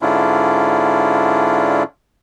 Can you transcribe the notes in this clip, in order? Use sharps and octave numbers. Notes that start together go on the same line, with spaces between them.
G#2 D3 C#4 D4 E4 F4